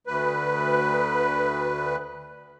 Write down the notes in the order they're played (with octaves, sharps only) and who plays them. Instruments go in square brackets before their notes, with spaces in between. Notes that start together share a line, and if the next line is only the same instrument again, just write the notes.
[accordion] D2 B4